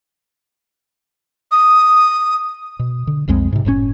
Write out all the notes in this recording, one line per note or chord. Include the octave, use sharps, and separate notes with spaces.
D#6
B2
D3
B1 F2 G#3 C4
G#2 C3
F#1 A2 C3 C#4